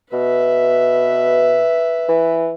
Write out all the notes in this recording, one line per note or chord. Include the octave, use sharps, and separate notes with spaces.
B2 B4 E5
E3